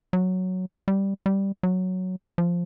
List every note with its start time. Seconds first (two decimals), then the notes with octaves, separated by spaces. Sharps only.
0.13 F#3
0.88 G3
1.26 G3
1.63 F#3
2.38 F3